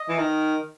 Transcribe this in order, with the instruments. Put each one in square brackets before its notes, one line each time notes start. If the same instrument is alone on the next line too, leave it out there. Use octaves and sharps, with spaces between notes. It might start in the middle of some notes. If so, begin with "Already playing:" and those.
Already playing: [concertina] D#5
[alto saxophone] E3
D#3